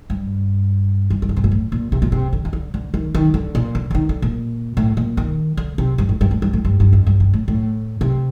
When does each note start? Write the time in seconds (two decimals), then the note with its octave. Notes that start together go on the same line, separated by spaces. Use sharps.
0.10 G2
1.10 G2
1.22 D#3
1.29 D3
1.37 C3
1.44 A#2
1.51 A2
1.72 A#2
1.92 C3
2.02 A#2
2.12 C3
2.33 D3
2.45 D#3
2.53 D3
2.74 D3
2.94 D#3
3.15 D#3
3.34 D3
3.55 A#2
3.75 D3
3.91 D3
3.95 D#3
4.09 D3
4.22 A#2
4.77 A2
4.97 A#2
5.17 D#3
5.57 D3
5.78 C3
5.98 G2
6.09 A2
6.21 G2
6.31 A2
6.42 G2
6.53 A2
6.65 G2
6.80 G2
6.93 F2
7.07 G2
7.20 G2
7.34 A2
7.48 A2
8.01 C3